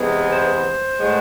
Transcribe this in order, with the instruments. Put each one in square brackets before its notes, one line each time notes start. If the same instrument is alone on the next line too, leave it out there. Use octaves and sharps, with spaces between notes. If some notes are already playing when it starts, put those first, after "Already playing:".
Already playing: [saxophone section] E2 C3 G#3 B3
C5
A2 G#3 B3